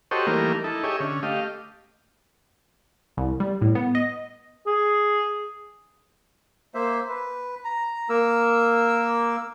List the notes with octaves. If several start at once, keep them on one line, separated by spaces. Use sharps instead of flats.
F#4 G4 A4 C5 C#5 D#5
E3 G3 A3 A#3 D#4 A#4
D#4 E4 A4
G4 G#4 C#5 D#5 E5
D3 C#4
A3 G4 D#5 F5
C2
G3
A2
B3
D#5
G#4
A#3 C5 E5
B4
A#5
A#3 A#4 E6